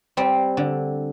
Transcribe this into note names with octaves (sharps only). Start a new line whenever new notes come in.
G3 C4
D3